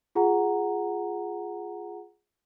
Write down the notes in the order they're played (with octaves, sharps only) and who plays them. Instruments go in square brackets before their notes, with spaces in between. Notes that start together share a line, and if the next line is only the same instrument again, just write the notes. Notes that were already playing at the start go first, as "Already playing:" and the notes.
[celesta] F4 G#4 F#5 A#5